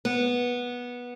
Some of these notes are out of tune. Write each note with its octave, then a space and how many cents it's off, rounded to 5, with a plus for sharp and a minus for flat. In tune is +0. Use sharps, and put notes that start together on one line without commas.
B3 -15